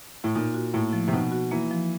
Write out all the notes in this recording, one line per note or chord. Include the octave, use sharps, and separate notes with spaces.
A2
A#2 D#4
F#4
A2 A#3
F3
C3
B2 D#4
F#4
E3 A#3
F3